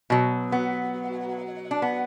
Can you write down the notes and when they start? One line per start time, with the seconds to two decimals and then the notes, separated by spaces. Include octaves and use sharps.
0.10 B2 F#3
0.52 B3
1.71 D4
1.82 B3